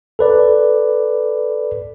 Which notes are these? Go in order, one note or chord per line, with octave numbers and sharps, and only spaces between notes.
A4 B4 D5